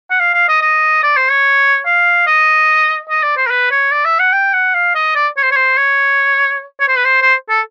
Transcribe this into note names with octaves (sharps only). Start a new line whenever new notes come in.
F#5
F5
F5
D#5
D#5
D5
C5
C#5
F5
D#5
D#5
D5
C5
A#4
B4
C#5
D5
E5
F#5
G5
F#5
F5
D#5
D5
C#5
C5
C#5
C5
C#5
C#5
C5
B4
C5
C5
A4